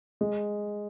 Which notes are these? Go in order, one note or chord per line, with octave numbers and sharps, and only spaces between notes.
G#3